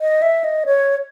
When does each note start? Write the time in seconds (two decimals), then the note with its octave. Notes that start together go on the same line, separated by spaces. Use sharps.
0.01 D#5
0.22 E5
0.44 D#5
0.66 C#5